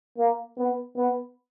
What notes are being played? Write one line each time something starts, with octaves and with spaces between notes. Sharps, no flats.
A#3
B3
B3